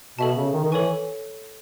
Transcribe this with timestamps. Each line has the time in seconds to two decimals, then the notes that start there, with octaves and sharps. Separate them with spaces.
0.18 B2 A4 E5 A5
0.36 C#3
0.53 D#3
0.65 D#3
0.71 E3 A4 C#5 G#5 C#6